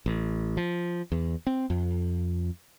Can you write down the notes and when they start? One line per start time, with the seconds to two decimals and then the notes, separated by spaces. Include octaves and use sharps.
0.06 A1
0.57 F3
1.12 E2
1.47 C4
1.70 F2